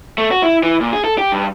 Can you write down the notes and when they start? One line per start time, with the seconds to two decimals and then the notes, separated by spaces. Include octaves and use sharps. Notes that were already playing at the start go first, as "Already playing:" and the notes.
0.18 A3
0.31 F#4
0.43 E4
0.63 E3
0.81 A#2
0.93 G#4
1.04 A4
1.18 G4
1.32 G2